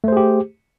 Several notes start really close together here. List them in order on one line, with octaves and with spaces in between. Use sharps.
A3 C5 G#4 G4